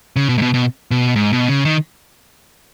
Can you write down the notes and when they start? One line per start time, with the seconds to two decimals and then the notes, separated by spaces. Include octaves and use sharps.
0.16 C#3
0.29 B2
0.38 G#2
0.42 B2
0.54 B2
0.91 B2
1.16 G#2
1.33 B2
1.48 C#3
1.65 D#3